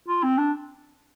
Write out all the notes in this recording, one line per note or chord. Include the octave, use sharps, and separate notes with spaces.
F4
C4
D4